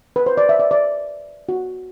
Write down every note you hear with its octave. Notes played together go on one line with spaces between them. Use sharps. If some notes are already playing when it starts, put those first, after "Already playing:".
B4
C5
D5
E5
D5
D5
F#4